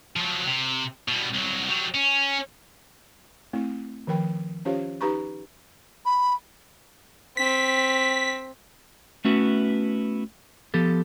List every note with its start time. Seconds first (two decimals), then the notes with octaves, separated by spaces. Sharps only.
0.16 F3 F#3
0.46 C3
1.08 B2 G3
1.34 C2 F#3
1.69 F#3 G3
1.95 C#4
3.53 A3 C4 E4
4.07 D#3 F3 A#4 G5 B5
4.65 C#4 F4 G4 C5 C#5 F5
5.01 D#4 G4 B4 A#5 B5 C#6
6.06 B5
7.37 C4 B6
9.25 A3 B3 C#4 E4 F#4 B4
10.74 F3 B3 G4 A4